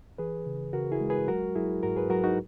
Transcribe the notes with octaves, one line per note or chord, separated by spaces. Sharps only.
E3 G#4 B4
C#3
C#3 F#4 A#4
E4 G#4
G#3
G#4 B4
F#3 F#4 A#4
F#3 E4 G#4
G#2 F#4 A#4
G#4 B4
F#3 F#4 A#4
D#4 F#4